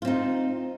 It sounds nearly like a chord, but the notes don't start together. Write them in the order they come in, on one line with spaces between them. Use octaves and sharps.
F4 C4 D#4